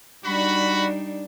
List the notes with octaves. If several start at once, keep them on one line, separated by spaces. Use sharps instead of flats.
G3 D4 D#4 F#4 B5